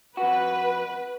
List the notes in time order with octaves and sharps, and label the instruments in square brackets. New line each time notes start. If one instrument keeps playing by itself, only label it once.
[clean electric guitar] F2 F#4 [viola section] B4